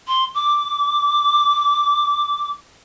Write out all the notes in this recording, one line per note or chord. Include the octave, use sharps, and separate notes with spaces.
C6
D6